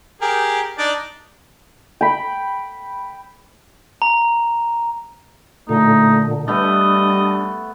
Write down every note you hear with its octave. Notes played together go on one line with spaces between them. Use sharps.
G4 G#4 A#4
D4 D#4 D5
G5 B5
A#5
A#2 D3 A3 D#4
G3 A3 B3 D4 D#5